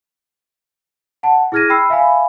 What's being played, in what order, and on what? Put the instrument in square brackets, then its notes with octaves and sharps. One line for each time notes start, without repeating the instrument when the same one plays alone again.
[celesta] F#5 A5
E4 G#4 F6 G#6 A#6 D#7
G5 B5 E6 C7
E5 F5 G#5 B5